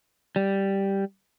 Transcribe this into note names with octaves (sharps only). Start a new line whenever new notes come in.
G3